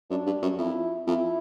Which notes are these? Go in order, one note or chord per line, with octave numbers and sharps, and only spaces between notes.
F#2 D4
G2
F#2
F2 E4
F2 E4